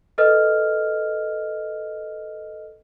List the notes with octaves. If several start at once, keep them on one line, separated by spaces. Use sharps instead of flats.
A4 B4 D#5 F6